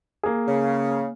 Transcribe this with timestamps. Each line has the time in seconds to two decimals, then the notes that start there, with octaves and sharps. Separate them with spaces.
0.23 A#3 G#4
0.47 C#3